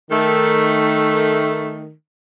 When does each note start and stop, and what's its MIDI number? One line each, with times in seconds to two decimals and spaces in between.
0.10 1.91 51
0.10 1.91 57